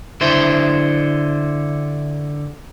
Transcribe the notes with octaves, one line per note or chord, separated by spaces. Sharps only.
D3 E4 C5